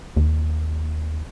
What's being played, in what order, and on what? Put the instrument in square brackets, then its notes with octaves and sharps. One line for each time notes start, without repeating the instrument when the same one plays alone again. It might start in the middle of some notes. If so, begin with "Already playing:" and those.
[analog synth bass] D#2